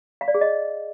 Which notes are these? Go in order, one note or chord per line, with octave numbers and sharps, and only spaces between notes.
F5
D5
G#4
D#5